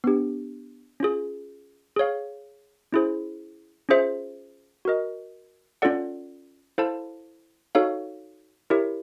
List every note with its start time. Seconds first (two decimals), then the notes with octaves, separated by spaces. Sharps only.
0.04 B3 D4 G4
1.00 C#4 F4 G#4
1.96 G#4 C#5 F5
2.92 C#4 E4 G#4 C5
3.89 C#4 F4 G#4 C5 E5
4.85 F#4 A#4 D#5
5.82 C#4 F4 A4 D5 F#5
6.78 E4 A4 C5 F5 A5
7.75 D#4 F#4 A4 C#5 F5
8.70 E4 G4 A#4 C#5 E5